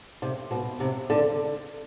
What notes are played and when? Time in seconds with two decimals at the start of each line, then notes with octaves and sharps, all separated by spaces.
0.22 C3
0.51 B2
0.80 C3
1.10 D3